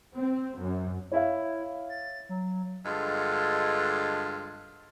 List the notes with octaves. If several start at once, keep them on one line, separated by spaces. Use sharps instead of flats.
C4
F#2
E4 C#5 E5 F5
A6
F#3
G2 D3 G#3 F4 A4 D#5